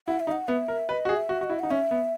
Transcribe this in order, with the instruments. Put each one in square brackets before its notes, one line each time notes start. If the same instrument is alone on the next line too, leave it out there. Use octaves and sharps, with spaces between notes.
[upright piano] E4 [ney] F#5
[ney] E5
[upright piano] D#4
[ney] F#5
[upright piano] B3 [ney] E5
[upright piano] A#4
[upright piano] B4 [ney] D#5
[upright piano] F#4
G#4
[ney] E5
[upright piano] F#4
[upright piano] F#4 [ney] D#5
[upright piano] E4
[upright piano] D#4 [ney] F#5
[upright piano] C#4 [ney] E5
[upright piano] B3